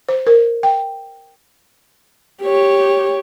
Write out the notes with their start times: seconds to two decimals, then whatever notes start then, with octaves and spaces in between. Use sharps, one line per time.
0.09 C5
0.27 A#4
0.63 G5
2.43 G4 C#5